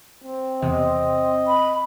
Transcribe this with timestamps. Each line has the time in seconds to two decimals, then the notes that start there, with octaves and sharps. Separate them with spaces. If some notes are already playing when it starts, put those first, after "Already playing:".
0.24 C4
0.62 E2 C3 D#5
1.48 B5